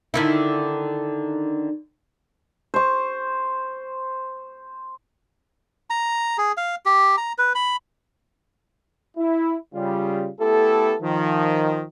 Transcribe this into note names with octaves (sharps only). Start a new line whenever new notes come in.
D3 D#3 E4
C5 C#6
A#5
G#4
F5
G4
A#5
B4
B5
E4
C#3 G3 F4
A3 B3 E4 G4 A4
D#3 F3